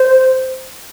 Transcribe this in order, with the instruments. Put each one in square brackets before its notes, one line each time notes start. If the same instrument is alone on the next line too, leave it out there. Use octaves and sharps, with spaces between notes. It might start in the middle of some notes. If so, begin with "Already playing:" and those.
Already playing: [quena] C5